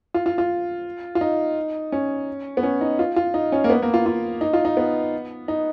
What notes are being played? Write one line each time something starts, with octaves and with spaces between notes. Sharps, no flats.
F4
F4
F4
F4
D#4
C#4
B3
C#4
D#4
F4
F4
D#4
C#4
A#3
B3
A#3
F4
F4
D#4
F4
D#4
B3
D#4